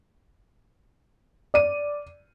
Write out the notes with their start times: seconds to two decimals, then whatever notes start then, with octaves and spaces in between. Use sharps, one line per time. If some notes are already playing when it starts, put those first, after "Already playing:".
1.54 D5 D#7